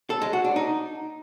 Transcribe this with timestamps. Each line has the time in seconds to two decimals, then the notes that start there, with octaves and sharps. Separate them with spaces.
0.10 A4
0.22 G#3
0.33 F#4
0.45 D4
0.56 D#4